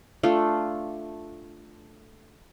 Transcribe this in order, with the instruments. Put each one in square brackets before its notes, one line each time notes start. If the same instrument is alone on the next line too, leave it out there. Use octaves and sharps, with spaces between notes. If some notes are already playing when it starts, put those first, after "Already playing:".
[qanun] A3 D4 F4